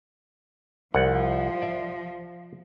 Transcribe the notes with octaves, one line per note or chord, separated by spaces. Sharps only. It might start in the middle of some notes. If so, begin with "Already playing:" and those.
C2 F3 F#5
D5 E5